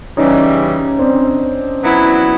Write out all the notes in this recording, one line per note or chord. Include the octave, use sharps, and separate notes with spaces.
C#3 E3 G3 C#4 D#4
C4 D4
F#3 B3 E4